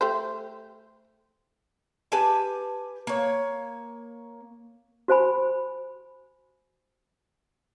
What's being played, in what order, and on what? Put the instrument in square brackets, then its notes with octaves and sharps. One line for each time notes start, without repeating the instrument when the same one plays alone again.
[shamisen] A3 G4 C5
[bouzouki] G4 B4 G#5 A5
A#3 C#5
[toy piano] F#4 C5 G#5 B5